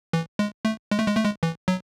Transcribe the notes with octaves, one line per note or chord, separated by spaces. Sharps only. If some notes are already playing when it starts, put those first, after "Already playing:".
E3
G#3
A3
G#3
A3
G#3
A3
G#3
E3
F#3